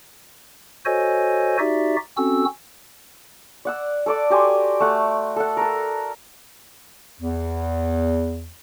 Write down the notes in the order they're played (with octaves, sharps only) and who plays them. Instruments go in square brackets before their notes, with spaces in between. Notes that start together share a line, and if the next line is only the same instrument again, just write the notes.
[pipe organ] F#4 A4 C5 C#5 D#5 G#5
D#4 F#4 G4 D5 E5
C4 C#4 F#4 A4 E6
[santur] D5 F#5 E6
A4 D5 D6
F#4 G4 G#5 C6
A3 F#5
A4 F#5
A4 A#4
[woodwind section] E2